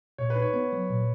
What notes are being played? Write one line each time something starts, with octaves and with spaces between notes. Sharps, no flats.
A#2 C#5
B4
D#4
C#5
B3
F#3
A#2